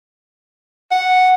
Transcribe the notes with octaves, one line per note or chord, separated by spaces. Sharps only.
F#5